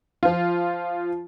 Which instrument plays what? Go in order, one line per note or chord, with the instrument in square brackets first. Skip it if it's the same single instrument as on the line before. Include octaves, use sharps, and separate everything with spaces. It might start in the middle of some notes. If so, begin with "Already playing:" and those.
[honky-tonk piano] F3 F4